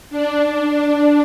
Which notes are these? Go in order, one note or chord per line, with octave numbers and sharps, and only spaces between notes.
D4
D4